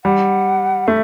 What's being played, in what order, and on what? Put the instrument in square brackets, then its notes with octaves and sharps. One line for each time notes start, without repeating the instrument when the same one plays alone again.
[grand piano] G3 [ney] F#5
[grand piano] A3 [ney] E5